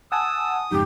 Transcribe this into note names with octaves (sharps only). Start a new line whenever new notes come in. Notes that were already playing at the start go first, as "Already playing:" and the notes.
F#5 G#5 A5 D#6 E6
F2 G#2 C#3 D#4 G4